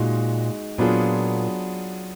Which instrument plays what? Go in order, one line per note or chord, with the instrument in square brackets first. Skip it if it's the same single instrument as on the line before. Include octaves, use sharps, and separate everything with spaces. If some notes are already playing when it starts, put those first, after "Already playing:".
Already playing: [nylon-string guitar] A#2 [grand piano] G#3 D#4 F#4
[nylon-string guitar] A#2 [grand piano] F#3 B3 D4 F4 G#4